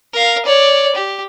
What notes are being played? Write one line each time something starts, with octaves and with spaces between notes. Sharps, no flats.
A#4 F5
C#5 D5
G4